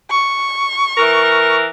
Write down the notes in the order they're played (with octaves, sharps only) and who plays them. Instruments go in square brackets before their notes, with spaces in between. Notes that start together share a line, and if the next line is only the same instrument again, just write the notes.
[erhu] C#6
[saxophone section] E3 A#4